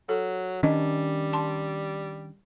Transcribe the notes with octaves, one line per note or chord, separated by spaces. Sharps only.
F#3 A4
D#3 G3 C#4 D4 D#5
A5 C6